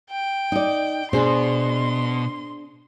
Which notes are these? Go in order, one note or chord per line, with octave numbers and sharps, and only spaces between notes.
G5
D#4 D5
B2 D4 G#4 C5 C6